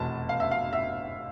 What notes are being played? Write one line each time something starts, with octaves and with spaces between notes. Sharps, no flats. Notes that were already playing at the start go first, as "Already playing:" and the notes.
Already playing: F1 E2 B2 A5
F5
E5
F5
E5